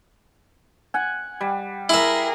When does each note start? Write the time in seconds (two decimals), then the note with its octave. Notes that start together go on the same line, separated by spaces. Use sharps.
0.94 F#5 G#5
1.41 G3
1.89 E4 G#4 A#4 E5